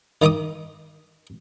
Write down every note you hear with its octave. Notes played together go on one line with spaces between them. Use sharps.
D#3 D#4 A#5 D6 D#6